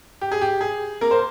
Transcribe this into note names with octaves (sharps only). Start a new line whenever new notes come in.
G4
G#4
G4
G#4
A#3 A#4
C5